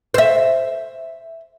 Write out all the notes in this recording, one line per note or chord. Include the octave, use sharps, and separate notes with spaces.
C5 E5